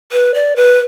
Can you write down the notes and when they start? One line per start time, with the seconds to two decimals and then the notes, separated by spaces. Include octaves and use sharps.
0.12 B4
0.34 D5
0.56 B4